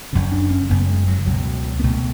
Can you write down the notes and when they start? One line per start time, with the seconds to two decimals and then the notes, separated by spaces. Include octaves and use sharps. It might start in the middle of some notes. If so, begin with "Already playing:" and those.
0.13 F#1 F#2 C#3
0.32 D4
0.50 C#4
0.70 F#1 F#2 C#3 B3
0.81 A3
0.89 G#3
1.08 F#3
1.26 C#2 B2 F#3
1.79 B3
1.84 C#2 B2 A3